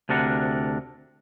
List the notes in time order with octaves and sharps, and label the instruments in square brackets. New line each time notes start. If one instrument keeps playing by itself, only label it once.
[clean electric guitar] D2 C3 D4 A#4 F#5